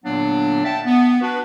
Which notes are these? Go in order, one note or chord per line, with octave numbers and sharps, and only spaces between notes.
A#2 D3 F#3 A#3 B3 D4
E5 F#5 G5 A5
B3
D4 F#4 B4